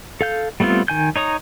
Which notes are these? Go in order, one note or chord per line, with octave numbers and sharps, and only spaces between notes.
A4 F5 G6
G3 A3 B3 C4 F4
D#3 G#5 G6
D#4 C#5 A#5 D#6